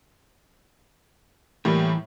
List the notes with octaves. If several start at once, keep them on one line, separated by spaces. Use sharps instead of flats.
A2 E3 G3 A#3